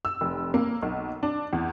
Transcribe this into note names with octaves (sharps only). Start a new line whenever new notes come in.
E6
F1
A#3
B1
D4
E2